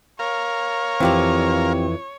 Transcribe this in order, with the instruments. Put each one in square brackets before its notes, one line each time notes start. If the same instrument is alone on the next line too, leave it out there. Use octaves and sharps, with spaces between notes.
[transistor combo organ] A#4 F5 [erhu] C#5
[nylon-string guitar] F2 G#2 E3 [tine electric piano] C4 F4 G4